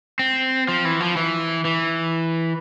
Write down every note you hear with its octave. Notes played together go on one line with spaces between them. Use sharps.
C4
F3
E3
F3
E3
E3